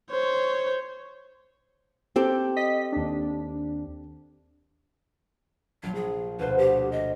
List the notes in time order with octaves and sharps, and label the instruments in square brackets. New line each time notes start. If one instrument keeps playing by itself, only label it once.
[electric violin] C5 C#5
[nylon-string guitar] C4 G4 A4
[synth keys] D#5 B6
D#2 D4
[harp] A#1 [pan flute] F#3
[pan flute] G#4
[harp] D2 B2 C5 [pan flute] B4
[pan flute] G4
D#5